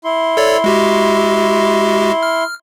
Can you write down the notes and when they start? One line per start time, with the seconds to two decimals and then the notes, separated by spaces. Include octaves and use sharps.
0.04 E4 C6
0.37 A4 C#5 D5
0.64 G#3 F#4 G4
2.23 F6